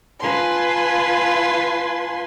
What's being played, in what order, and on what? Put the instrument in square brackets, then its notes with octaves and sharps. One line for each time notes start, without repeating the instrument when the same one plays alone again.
[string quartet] F4 B4 G#5 A5 C6